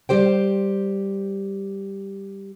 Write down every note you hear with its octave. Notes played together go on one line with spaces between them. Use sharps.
G3 G4 C5 G5